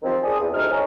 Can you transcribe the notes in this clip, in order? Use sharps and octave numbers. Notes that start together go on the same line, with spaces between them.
C3 D#3 F3 C4
D4 G#4 D#6
E2
D2 C3 D#4 F6
C2 F#3 D#4 G#4 C#5 A#5